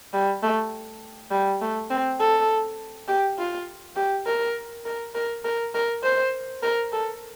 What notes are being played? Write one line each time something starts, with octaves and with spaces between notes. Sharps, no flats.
G3
A3
G3
A3
C4
A4
G4
F4
G4
A#4
A#4
A#4
A#4
A#4
C5
A#4
A4